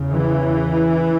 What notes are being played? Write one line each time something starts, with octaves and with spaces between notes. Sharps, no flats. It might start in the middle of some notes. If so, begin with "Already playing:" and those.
Already playing: E2 C#3
E3